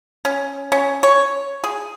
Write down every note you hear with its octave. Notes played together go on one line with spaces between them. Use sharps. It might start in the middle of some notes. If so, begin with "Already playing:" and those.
C#4
C#4
C#5
G#4